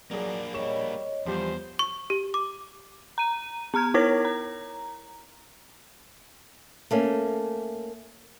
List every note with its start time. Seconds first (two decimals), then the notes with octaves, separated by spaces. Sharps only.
0.11 F#3 A#3 D4 G#4 D5
0.54 G3 G#4 C#5 D#5 C#6 E7
1.26 E2 F3 G3 G4 C5
1.79 C#6
2.10 G4
2.34 D6
3.18 A#5 D#7
3.74 B3 A#5 F6 G#6
3.94 D#4 E4 A#4 C#5 G#6 A#6
4.25 A#5
6.91 A3 A#3 C#4